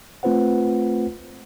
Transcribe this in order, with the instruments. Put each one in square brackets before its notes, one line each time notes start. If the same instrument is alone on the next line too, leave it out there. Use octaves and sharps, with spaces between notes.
[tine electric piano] A3 C4 F4 B4 C5 F#5